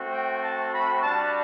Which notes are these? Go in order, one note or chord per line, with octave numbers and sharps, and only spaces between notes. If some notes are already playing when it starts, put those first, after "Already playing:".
Already playing: A3 C4 F#4
G5
A5
B5
G3 D4 F#4 A5